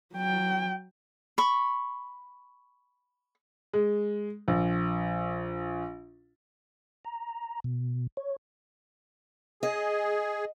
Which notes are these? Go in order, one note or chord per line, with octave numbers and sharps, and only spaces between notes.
F#3 G5
B5 C#6
G#3
A#1
A#5
B2
C#5
G#4 D#5